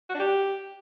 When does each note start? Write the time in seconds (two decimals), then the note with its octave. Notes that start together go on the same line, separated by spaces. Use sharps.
0.10 F#4
0.15 D4
0.20 G4